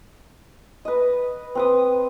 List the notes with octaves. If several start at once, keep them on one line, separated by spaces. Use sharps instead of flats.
B4 D#5
C4 B4 D#6